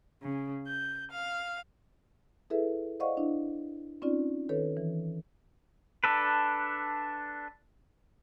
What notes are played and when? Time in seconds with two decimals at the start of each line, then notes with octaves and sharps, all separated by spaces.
0.22 C#3
0.67 G6
1.11 F5
2.50 E4 G#4 A4 B4 E5
3.00 C5 D5 D#5 F5 F#5 C#6
3.17 D4 E4
4.02 C4 C#4 D#4 F4 D5
4.49 D#3 A4 B4 C#5
4.77 E3
6.04 D4 A4 B4